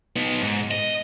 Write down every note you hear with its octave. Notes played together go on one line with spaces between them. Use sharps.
B3 D#4
G#2
D#5